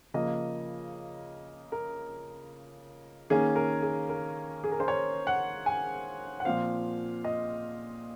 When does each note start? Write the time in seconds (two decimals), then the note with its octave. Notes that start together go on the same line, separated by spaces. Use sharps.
0.14 C#3 F3 A#3 D#5
1.72 A#4
3.30 D#3 A#3 C#4 G#4
3.56 A#4
3.82 G#4
4.09 A#4
4.64 G#4
4.72 A#4
4.80 C5
4.88 C#5
5.27 F#5
5.66 G#5
6.40 F#5
6.45 A#2 F3 C4 F5
7.24 D#5